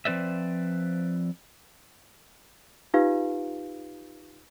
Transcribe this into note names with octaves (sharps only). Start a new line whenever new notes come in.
F3 C4 B4 D5 E5
D#4 F4 G4 B4 F5